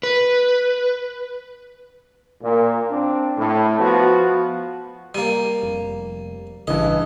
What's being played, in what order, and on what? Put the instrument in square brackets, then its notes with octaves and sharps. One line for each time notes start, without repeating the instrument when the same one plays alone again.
[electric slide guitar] B4
[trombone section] A#2
C4 D4
A2
F3 B3 F#4
[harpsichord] G3 A#3 [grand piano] D#7
[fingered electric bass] F1
[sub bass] A1 [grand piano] G2 E3 [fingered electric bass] C#3 [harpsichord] D#5